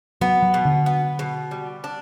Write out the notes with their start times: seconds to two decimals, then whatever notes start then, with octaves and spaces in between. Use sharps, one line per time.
0.21 F#3 B3
0.42 F#3
0.54 B2
0.65 D3
0.86 B3
1.19 B2
1.51 G3
1.84 D4